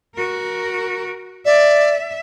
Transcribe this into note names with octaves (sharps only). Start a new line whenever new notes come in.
F#4 A#4
D5 E5